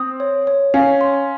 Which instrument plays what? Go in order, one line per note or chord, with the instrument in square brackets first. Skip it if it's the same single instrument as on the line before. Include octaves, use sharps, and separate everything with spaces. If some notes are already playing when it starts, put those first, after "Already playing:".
Already playing: [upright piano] C4 [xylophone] D#6
[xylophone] C#5
C#5
[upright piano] C#4 [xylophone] F5
[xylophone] C6